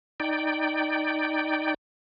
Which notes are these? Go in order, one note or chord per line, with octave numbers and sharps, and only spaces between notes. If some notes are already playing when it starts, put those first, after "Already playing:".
D#4 D5 G5